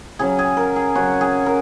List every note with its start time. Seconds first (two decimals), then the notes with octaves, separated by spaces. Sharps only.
0.19 C#3 F#3 C#4 G#4
0.39 G#4
0.57 A#4
0.76 G#4
0.95 C#3 F#3 C#4 F#4
1.21 G#4
1.46 A#4